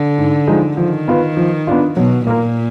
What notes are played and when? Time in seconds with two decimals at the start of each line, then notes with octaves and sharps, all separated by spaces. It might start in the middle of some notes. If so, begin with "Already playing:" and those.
Already playing: D3
0.18 G#2
0.47 F3 G#3 D#4
0.77 D#3 F3
1.08 B3 F4 B4
1.37 F3
1.67 B3 D4 F4
1.97 B2 F#3
2.27 A#2 A#3 F4 A#4